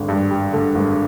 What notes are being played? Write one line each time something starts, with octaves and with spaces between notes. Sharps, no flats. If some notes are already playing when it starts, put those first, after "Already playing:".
Already playing: G#1 D3
G2
G3
D3
G#1